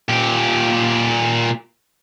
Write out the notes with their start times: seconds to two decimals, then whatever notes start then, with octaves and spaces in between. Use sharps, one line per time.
0.09 A#2 G4